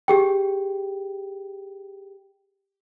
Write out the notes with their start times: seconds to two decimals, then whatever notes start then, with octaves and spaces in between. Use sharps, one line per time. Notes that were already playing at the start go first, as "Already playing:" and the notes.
0.08 G4 G#4 G5